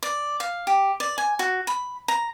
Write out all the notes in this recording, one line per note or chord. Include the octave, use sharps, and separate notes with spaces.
D5
F5
G4
D5
G#5
F#4
B5
A#5